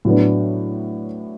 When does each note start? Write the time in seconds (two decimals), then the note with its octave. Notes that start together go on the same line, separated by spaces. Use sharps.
0.05 A2 F#3 B3 D4